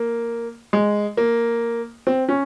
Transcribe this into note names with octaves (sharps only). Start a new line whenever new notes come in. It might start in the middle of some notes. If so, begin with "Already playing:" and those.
Already playing: A#3
G#3
A#3
C4
C#4